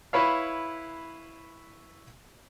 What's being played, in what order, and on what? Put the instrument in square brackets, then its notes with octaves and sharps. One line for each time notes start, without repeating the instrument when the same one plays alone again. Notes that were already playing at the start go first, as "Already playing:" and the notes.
[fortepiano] E4 B4 C#5 F5